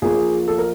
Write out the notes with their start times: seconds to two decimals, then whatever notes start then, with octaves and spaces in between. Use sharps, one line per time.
0.02 A#1 A#2 F3 A#3 G#4
0.48 A4
0.58 A#4